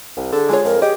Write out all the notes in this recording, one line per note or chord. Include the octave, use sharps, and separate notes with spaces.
C2
D3 G#4 A4
G#3 F4 G#4 C#5
F2 A#4
G4 G#4 D#5